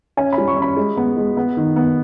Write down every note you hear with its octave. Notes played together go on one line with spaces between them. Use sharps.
C#4 G#5
B5
G3
C#6
C#4
B5
G#3
B3
G#3
B3
D#3
B3